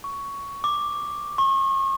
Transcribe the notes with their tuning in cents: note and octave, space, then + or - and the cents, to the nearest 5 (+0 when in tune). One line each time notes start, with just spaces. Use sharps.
C#6 +10
D6 +5
C#6 -40